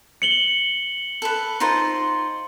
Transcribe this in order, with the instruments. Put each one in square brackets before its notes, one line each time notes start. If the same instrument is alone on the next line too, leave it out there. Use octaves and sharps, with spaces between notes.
[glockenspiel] C#7 F#7 G7
[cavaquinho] A4 B4
D#4 F4 C5